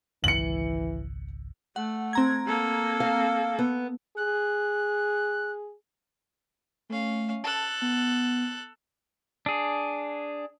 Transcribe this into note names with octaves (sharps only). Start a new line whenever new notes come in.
G#1 C#2 E3 C#7 F#7
A3 F#5
C4 A#5 G#6
A#3 A4
F5
B3
G#4 F#6
A3 C#4 F5
A4 A5 F#6
B3
D4 G#4